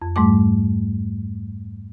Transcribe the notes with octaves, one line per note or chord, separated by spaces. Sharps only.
F2
G#2 G3 A3 D6